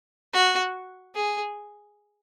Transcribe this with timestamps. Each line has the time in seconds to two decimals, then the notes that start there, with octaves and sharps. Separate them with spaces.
0.34 F#4
1.15 G#4